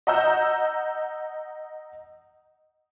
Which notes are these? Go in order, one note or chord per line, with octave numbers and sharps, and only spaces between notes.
D#5 F#5 A#5 E6 G6